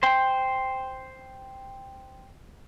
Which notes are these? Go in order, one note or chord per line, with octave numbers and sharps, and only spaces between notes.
C5 G5